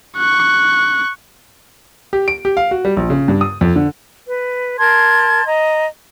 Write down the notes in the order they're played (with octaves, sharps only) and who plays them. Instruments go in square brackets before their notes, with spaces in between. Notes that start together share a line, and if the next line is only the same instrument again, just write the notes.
[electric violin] C#6 F#6
[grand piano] G4
D7
G4
F5
F#4
G3
A#1
C#3
G2
D#6
F2
D3
[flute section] B4
A#4 A5 C6 G#6
D#5 A#5